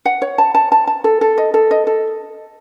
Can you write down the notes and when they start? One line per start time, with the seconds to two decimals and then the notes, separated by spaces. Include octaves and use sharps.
0.06 F#5
0.22 C#5
0.38 A5
0.55 A5
0.72 A5
0.87 A5
1.04 A4
1.21 A4
1.38 D#5
1.54 A4
1.71 D#5
1.87 A4